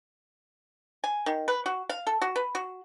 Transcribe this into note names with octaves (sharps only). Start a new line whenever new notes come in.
G#5
D#3
B4
F#4
F5
A4
F#4
B4
F#4